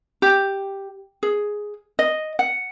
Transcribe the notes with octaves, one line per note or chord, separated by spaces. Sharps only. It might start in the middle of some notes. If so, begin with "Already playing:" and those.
G4
G#4
D#5
F#5